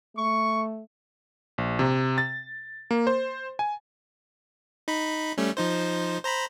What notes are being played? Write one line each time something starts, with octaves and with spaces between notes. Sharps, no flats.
A3 C#6
A#1
C3
A6
A#3
C5
G#5
D#4 B5
G3 A3 C#4
F3 D#4 C5
C5 A#5 B5